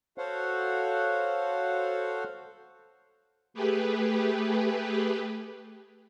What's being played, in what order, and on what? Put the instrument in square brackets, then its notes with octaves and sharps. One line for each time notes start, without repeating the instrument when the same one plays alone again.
[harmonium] F#4 A4 C5 C#5 F5 F#5
[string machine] A3 G4 G#4 B4